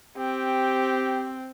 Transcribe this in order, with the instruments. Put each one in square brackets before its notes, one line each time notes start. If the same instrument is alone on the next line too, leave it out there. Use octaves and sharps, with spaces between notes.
[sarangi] C4 [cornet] G4